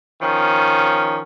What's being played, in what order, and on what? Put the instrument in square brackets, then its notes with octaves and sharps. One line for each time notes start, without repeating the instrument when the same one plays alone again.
[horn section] D#3 F3 C#4